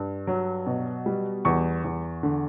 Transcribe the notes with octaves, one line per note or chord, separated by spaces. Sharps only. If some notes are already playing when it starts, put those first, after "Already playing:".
Already playing: G2
F#3
B2
G3
E2 C#6
E2
D3